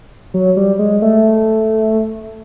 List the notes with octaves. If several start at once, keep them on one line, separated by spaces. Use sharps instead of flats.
F#3
G3
G#3
A3